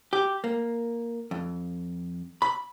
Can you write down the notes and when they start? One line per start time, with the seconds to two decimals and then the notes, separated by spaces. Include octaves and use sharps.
0.13 G4
0.44 A#3
1.31 F2
2.42 B5